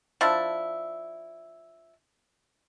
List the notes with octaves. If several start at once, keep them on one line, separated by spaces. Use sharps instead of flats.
F3 D4 E4